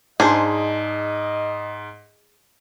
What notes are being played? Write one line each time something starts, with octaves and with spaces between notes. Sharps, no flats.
G#2 D4 D#4 G#4 C5 D#5